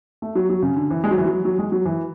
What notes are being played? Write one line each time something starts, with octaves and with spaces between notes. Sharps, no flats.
A3
F#3
F#3
C#3
D3
E3
G#3
F#3
E3
F#3
F#3
G#3
F#3
E3